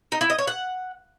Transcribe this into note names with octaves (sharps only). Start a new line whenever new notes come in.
D#4
E4
D#5
C#5
F#5